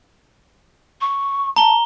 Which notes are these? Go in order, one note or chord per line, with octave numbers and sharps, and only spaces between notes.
C#6
A5 A#5 G7